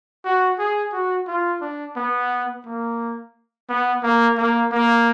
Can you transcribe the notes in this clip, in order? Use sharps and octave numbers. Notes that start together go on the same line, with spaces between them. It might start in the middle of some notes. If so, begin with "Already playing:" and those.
F#4
G#4
F#4
F4
D4
B3
A#3
B3
A#3
A#3
A#3